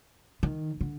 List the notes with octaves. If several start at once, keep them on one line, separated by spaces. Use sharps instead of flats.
D#3
D3